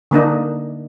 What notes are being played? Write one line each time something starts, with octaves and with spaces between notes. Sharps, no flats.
D3 A#3 D4 D#4